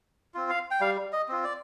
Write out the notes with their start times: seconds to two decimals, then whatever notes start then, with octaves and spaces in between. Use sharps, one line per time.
0.34 C4 F4
0.50 F5
0.71 G5
0.80 G3 F5
1.12 D#5
1.29 C4 F4
1.44 D5